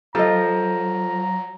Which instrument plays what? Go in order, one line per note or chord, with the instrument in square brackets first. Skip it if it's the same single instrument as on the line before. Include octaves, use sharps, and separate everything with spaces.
[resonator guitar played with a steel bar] F3 [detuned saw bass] F#3 [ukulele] A4 D#5 [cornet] A#5